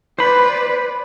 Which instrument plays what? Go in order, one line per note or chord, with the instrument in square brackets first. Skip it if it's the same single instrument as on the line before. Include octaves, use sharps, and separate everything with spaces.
[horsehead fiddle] B4 D5 [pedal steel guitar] C5 B5